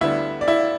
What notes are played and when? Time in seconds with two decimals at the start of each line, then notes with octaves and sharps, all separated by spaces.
0.01 D2 D3 G3 B3 D4 E4 E5
0.41 D5
0.48 E4 E5